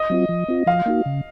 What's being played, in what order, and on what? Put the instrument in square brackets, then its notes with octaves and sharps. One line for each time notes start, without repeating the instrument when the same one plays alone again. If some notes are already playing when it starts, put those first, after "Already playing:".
Already playing: [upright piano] D#5
[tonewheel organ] F#3 C4 F4
F3
C4 F4
[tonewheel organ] F3 [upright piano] F5
[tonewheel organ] A#3 D#4 F#4
C#3